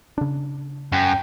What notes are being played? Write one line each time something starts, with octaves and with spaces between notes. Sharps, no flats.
C#3 D4
F#2 G5